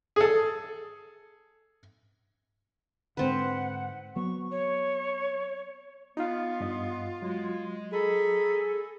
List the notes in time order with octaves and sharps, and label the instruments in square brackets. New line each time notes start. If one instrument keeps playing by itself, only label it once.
[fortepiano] G#4 A4
[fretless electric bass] G#2 D3 [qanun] C4 B4 [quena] F#5
[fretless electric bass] F#3 B3 [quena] C#6
[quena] C#5
[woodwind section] B3 [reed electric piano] D#4 F5 [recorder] F4
[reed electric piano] G2 D#5
[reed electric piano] F#3 [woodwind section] G#3
[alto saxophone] G#4 [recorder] A4 [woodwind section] D#5 A#5 B5